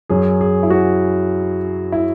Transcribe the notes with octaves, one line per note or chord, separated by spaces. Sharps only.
F#2 F#3 G#4
G#4
E4
F#4
E4